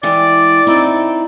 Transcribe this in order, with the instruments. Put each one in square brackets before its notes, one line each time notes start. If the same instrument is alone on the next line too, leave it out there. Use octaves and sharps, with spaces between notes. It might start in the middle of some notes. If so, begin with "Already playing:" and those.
[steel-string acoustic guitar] E3 G3 G#3 [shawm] D5
[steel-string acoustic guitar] C4 D#4 E4